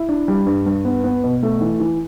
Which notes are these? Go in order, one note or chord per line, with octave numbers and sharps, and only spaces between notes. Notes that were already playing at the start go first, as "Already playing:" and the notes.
Already playing: E4
D4
G3
G2
G2
B3
B3
B2
A3
E3
E3